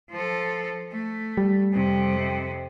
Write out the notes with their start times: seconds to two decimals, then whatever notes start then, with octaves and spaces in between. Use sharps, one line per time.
0.10 F3 A4
0.92 A3
1.37 G3
1.73 F2 C3